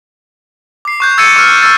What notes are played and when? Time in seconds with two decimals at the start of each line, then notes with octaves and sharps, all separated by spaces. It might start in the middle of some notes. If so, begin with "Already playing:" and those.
0.85 D6 C7
1.00 C#6 F#6 G6
1.18 E6 G#6 A6 C#7 D#7
1.36 C#6 E6 F6
1.62 E6 A6